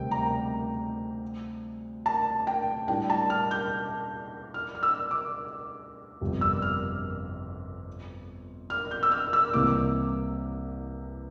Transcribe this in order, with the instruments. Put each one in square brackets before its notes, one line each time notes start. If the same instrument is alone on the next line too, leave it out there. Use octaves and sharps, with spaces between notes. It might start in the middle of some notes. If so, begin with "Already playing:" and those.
Already playing: [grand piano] D2 C3 G3 C4 [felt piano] G5
[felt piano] A#5
A5
G5
[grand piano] A2 G3 D4 [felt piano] G5
[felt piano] A5
F6
G6
F6
F6
E6
D6
[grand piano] G1 F2 C3 G3
[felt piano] E6
F6
F6
G6
E6
F6
E6
[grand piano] C2 C3 E3 A#3 [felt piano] D6